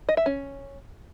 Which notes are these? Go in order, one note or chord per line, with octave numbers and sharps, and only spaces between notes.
D#5
E5
C#4